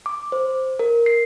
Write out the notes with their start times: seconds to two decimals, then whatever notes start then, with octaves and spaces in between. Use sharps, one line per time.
0.06 D6
0.32 C5
0.79 A#4
1.06 C7